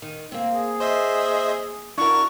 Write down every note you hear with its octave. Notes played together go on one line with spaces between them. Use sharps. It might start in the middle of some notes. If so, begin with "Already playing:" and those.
D#3
A#3 C4
G#4
C5 D#5 E5
D4 E4 F#4 A#4 C#6